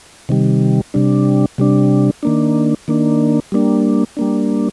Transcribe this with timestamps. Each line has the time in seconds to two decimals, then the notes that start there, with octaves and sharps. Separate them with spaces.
0.29 C3 D#3 G3
0.94 C3 G3 D4
1.58 C3 G3 D4
2.23 D#3 A#3 D4
2.88 D#3 A#3 D4
3.52 G3 A#3 D4
4.17 G3 A#3 D4